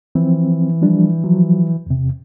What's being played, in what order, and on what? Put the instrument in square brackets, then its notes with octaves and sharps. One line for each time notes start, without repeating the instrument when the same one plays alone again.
[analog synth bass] E3 [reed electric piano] F3 C4
[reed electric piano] F3 G3 D4
F3 F#3
E2 C3